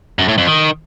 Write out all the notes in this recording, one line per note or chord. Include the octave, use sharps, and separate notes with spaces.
F#2
A2
F2
D#3